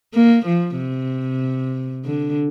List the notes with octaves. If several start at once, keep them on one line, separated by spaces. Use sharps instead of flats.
A#3
F3
C3
D3